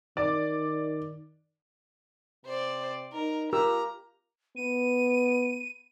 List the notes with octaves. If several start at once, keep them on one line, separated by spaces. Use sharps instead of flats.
D#3 D5
C3 C5 D5
D#4 A#4
F4 G4 A#4 A#5 E6
B3 D#7